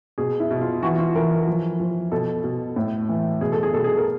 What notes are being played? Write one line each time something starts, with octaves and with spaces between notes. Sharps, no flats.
B2 G#4
E4
B2
F4
E3 F#4
F4
E3 A#4
F3
F3
B2 A4
B2
A2
E3
B2 G#4
A4
G#4
B2 A4
G#4
A#4